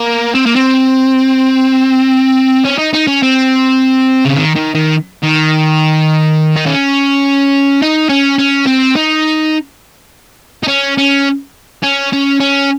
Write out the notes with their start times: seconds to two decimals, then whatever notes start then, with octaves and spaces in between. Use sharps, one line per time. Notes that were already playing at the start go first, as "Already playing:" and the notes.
Already playing: A#3
0.35 C4
0.46 A#3
0.56 C4
2.65 C#4
2.78 D#4
2.93 D#4
3.07 C#4
3.23 C4
4.25 C#3
4.37 D#3
4.56 D#3
4.75 D#3
5.23 D#3
6.56 D#4
6.66 C#4
7.82 D#4
8.10 C#4
8.39 C#4
8.67 C4
8.96 D#4
10.63 D#4
10.68 C#4
10.98 C#4
11.83 C#4
12.12 C#4
12.40 C#4